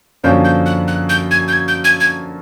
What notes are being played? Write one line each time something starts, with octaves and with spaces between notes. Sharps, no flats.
F#2 D3 F3 A#3 C#4 G6
G6
F#6
F#6
G6
G#6
G6
G#6
G6
G#6
G#6